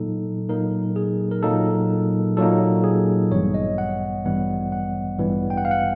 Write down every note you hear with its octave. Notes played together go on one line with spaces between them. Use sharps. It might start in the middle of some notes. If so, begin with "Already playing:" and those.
Already playing: A#2 F#3 A#3 D#4 A4
A#2 F#3 A#3 D#4 A#4
G#4
A#4
A#2 F#3 A#3 D#4 A4
A#2 F#3 A#3 D#4 A4
G#4
A1 G2 E3 G3 B3 C#5
D#5
F#5
A1 G2 E3 G3 B3 F#5
F#5
A1 G2 E3 G3 B3
G5
F#5
F5
F#5